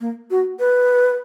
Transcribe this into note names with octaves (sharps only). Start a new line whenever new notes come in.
A#3
F#4
B4